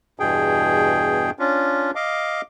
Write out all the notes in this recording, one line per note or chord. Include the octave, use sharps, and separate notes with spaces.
E2 G2 B2 G#4 G5
C#4 D4 F4
D#5 F5 D6